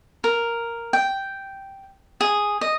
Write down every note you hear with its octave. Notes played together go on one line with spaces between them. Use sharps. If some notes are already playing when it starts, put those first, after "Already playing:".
A#4
G5
G#4
D#5